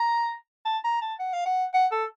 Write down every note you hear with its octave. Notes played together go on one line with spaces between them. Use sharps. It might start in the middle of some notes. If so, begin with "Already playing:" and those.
Already playing: A#5
A5
A#5
A5
F#5
F5
F#5
F#5
A4